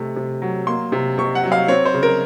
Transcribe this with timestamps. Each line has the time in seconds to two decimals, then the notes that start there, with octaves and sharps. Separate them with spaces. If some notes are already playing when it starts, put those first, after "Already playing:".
Already playing: C3 A3
0.16 C3
0.42 F#3
0.67 A#3 C6
0.92 C3
1.18 C3 C#6
1.35 F#5
1.44 F#3
1.52 F5
1.68 C4 C#5
1.86 C5
1.94 C#3
2.03 A#4